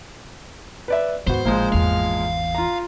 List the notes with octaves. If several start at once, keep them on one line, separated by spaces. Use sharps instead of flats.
B4 D5 E5
D#2 G#2 B3 F#4 C5
A1 A#2 D3 F3 G#3
G#1 E2 F5
F4 A#5